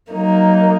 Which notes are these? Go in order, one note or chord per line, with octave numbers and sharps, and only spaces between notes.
F#3 A#3 D#4